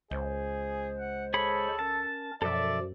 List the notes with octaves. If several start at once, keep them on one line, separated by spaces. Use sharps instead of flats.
C#2 G#3 G#4 C5
F#5
G#4 A4 C#5 B5
C#4 A#4 A5
F#2 B2 F3 A4 D5 E5